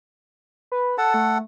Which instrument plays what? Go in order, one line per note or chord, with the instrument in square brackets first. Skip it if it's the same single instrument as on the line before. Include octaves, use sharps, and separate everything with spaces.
[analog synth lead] B4
[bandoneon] A4 F#5 [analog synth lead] A5
[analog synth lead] A3